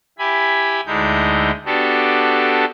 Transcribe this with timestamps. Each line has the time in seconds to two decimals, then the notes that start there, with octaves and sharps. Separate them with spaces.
0.19 E4 G4 G#5 B5
0.87 D2 D3 G#3 D#4 E4 G6
1.65 B3 D4 F#4 G4 A4